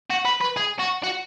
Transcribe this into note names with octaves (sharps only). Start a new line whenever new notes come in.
F#4
B4
B4
G#4
F#4
F#4